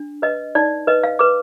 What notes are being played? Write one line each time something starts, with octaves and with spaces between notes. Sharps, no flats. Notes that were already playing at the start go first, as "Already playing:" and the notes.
Already playing: D4
B4 D#5
D#4 D5
B4 D#5
F5
B4 D6